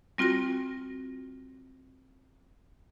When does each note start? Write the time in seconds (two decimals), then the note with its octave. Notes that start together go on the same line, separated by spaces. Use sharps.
0.18 G3 C4 F4 F#4 A#6